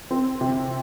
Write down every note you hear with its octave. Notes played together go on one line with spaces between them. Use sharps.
C4
C3